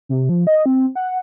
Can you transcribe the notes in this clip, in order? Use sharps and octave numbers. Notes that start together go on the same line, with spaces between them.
C3
F3
D#5
C4
F#5